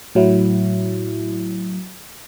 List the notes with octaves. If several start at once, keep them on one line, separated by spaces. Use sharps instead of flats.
A2 F#3 E4